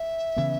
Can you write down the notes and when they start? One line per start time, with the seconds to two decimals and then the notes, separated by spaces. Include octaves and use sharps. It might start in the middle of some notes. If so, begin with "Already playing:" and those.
Already playing: E5
0.36 C#3 E3 B3